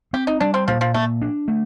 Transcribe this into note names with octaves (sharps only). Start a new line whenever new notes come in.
C4 G4
D#4
G3 D4
C4
A#2 F3
F3
A#2 A3
D4
A3